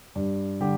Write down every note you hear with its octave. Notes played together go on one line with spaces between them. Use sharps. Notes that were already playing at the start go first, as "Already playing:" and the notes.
G2
D3 G3 G4